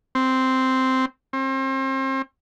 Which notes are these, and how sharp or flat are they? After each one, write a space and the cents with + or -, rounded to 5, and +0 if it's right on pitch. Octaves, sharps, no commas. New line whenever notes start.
C4 -5
C4 +35